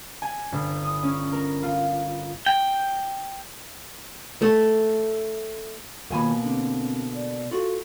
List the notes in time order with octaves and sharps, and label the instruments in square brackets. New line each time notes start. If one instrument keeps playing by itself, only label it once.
[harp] G#5
G1
D#6
C#4
A#4
F4
[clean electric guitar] G5
[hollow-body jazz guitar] A3
[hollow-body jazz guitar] D#2 G#5 B5 [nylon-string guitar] B2 A#3 [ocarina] F4
[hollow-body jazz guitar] D3 [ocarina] C4
[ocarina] D5
[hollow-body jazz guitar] F4 F#4 [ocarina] A4